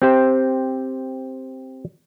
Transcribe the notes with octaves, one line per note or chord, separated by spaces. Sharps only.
C4 G4 C5